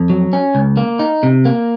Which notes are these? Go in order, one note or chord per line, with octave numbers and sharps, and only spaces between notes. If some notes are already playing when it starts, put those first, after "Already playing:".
Already playing: F2
F#3
C#4
C#2
A#3
D#4
C3
A#3